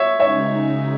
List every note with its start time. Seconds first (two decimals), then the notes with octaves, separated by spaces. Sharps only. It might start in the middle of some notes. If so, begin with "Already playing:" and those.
Already playing: C#5 E5
0.20 C#3 G#3 D#4 C#5 E5